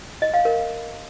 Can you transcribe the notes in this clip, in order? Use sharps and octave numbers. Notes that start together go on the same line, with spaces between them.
D#5
F5
A#4